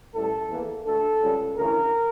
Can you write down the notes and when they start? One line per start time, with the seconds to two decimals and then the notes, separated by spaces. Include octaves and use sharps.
0.13 A1 A2 E3 G3 A4
0.49 E2 E3 A#3
0.85 D2 D3 A3 A4
1.21 C#2 C#3 G3
1.56 D2 C#3 E3 A#4